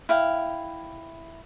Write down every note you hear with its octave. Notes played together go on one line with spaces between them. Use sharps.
E4 F5 G5